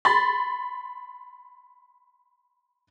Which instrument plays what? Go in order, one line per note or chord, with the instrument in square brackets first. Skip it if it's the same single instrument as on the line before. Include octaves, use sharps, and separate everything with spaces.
[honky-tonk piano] B5 C6 A6